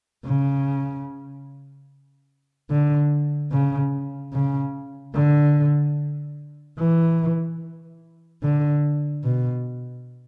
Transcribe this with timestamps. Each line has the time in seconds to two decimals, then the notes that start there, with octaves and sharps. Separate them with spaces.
0.25 C#3
2.70 D3
3.52 C#3
4.33 C#3
5.15 D3
6.79 E3
8.43 D3
9.24 B2